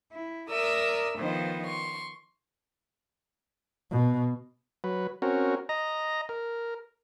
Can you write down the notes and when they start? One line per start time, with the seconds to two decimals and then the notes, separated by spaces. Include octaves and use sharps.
0.12 E4
0.49 A#4 D5 E5 A#5 D#6 E6
1.17 D#3 F3 B3 D#4 C5
1.64 C6 C#6
3.91 B2
4.84 F#3 B4
5.22 C4 C#4 F#4 A#4
5.69 D#5 A#5
6.29 A#4